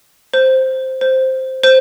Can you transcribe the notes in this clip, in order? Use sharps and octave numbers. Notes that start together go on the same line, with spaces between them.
C5
C5
C5